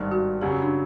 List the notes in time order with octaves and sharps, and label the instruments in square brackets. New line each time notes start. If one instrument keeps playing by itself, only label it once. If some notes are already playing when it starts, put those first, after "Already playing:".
Already playing: [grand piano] G#1 G2 D#3
[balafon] F#4
[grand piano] F#2 C#3 F#3 [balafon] G4
[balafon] C#4
D4